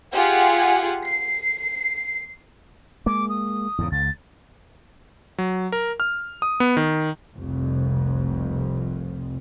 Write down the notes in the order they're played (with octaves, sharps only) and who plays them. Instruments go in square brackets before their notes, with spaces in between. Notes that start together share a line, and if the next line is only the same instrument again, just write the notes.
[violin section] F4 G4 G#4 F#5 G#5
C7
[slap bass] G#3 A#3 [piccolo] D6
[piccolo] D#6
[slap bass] E2 G#2 C#3
[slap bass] C#2 [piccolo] A6
[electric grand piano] F#3
A#4
F6
D#6
B3
D#3
[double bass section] F1 C2 F2